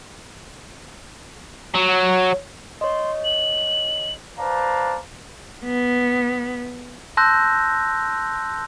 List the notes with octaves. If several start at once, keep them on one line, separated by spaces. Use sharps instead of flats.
F#3
C#5 D#5 C6
F#7
B4 C5 D5 F5 A5 A#5
B3
A5 C6 E6 F#6 G6 A#6